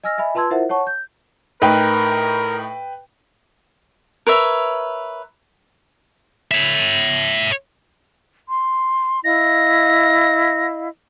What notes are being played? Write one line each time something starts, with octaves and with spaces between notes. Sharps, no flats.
D#5 G#5 E6 F6 A#6
D#5 E5 G#5 B5
F4 B4 A5 C6 E6 G#6
E4 F4 A#4 C5 E5 F#5
C#5 F#5 A5 C#6
G6
A2 D#4 A#4 B4 G5
A#4 B4 C#5 E5
C#5 E5
C6
E4 D#5 F5 A#6